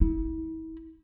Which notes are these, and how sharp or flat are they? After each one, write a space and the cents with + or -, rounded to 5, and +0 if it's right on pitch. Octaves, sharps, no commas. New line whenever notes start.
E4 -40